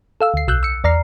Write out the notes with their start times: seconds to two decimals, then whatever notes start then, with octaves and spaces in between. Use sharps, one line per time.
0.21 A4 F5 E6
0.34 D2 C7
0.48 B1 E6 F#6 G6
0.63 E6 C#7
0.84 E2 D5 A#5 F6 C7